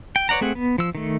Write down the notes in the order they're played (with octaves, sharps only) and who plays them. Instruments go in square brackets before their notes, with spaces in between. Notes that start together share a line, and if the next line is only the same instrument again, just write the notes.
[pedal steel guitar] G5
B4 C#5 D5 F#5 A#5
A3 C4 G#4 F#5
B3
F3 E6
D#3 A3